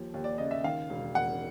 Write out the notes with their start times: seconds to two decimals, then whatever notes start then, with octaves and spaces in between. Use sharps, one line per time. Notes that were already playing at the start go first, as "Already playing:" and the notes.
Already playing: D#2 F3
0.14 D#2
0.24 D5
0.38 C#3 D#5
0.51 E5
0.64 D#3 F5
0.90 E1
1.15 E1 F#5